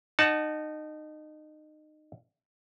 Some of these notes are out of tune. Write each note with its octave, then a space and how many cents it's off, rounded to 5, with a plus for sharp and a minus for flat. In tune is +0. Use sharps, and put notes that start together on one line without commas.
D#4 -25 F#5 +0 A5 +0